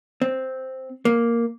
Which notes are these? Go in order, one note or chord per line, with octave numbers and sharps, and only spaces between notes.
C4
A#3